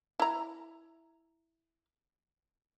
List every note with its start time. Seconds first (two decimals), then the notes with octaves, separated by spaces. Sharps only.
0.20 E4 A#5